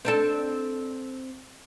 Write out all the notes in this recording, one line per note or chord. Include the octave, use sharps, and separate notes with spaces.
C4 D4 A4